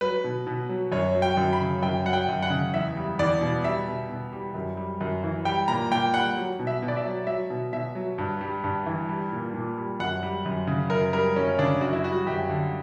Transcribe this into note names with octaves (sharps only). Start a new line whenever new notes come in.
F#3 B4
B2
B2
F#3
F#2 C#5
F#3
G5
F#2
B5
C#3
F#2 G5
F#3 F#5
G5
F#2
F#5
C#3
E2 E5
G3
E2 D5
B2
G3 E5
B2
B2
G3
F#2
G3
F#2
E3
G3 G5
A#2 A#5
A#2 G5
G3 F#5
F#3
B2
E5
B2
D5
E5
F#3
F#3 E5
B2
B2 E5
F#3
G2
G3
G2
E3
G3
A#2
A#2
G3
F#2 F#5
G3
F#2
C#3
F#2 A#4
G3 A#4
F#2 C#4
C#3 D4
F#2 F#4
E4
G3 F#4
F#2 G4
D3